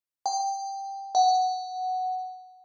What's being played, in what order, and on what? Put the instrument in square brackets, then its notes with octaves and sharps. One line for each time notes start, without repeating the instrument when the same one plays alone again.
[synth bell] G5
F#5